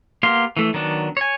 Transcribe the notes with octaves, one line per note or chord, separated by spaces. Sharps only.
A#3 B3 G4 F5 C6
E3 A3
D#3 F#3 B3 D4
C#5 G#5